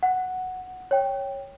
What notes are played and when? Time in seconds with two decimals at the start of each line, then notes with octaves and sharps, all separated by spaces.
0.03 F#5
0.91 C#5 G5